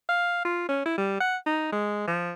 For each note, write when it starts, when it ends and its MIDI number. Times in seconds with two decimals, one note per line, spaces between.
0.09 0.42 77
0.45 0.67 65
0.69 0.85 61
0.85 0.98 64
0.98 1.18 55
1.20 1.36 78
1.46 1.69 63
1.73 2.07 56
2.07 2.32 53